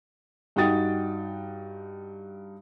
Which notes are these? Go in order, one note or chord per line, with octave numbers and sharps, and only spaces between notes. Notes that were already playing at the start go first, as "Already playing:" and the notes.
G2 D#4 F#4 G5 D#6 A6